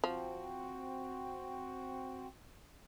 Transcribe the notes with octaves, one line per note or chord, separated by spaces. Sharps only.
F3 C4 F#4